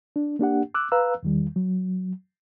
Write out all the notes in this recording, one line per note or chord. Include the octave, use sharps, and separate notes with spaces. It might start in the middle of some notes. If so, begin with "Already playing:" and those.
D4
A#3 D4 G4 F#5
D6 E6 F#6
B4 F5 A#5 E6 F#6
E2 D#3 G3
F#3